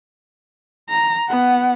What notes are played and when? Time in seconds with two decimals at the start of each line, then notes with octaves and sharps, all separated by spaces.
0.90 A#5
1.28 B3 F#5